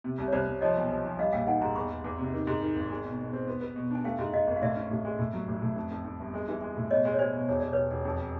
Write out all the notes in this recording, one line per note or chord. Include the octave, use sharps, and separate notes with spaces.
C3
C2
C#5
C2 C5 D5
C2
F3 C#5 D#5
B1
F3
F3
G3 D#5 F5
A#1 F5 G5
D#3 F#5 G#5
G#2 G#5 A#5
E2 B5 C#6
E2
E2
C3
D#3
G#2
D#3
G#1
G#3
B2
B2
C4
B3
B3
B2
D4 G#5
A3 F5 G5
G#2
G#2 D#5 F5
G#1
F5
A2 D5 E5
C#4
A2
G#3
A2
F#3
A1
A2
F2
F2
F2
G1
G#3
E3
G#3
A2
B2 C#5 D#5
G#3
C#5
G#3 C5 D5
B2
E1 C#5
E1 D5
E1 B4 C#5
E1
F2